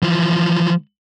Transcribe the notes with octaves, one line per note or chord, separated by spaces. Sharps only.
E3 F3